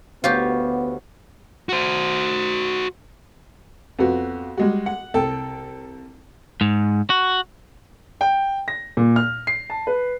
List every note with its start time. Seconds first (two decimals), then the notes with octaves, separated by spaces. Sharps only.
0.24 D2 B3 F4 G4 C#5 C#6
1.69 F#4 C5
3.99 F2 B3 F#4
4.57 G3 G#3 F#4
4.86 F#5
5.14 C2 A4 G5
6.61 G#2
7.10 F#4
8.21 G5
8.68 A#6
8.97 A#2
9.16 F6
9.47 C7
9.70 A5
9.87 B4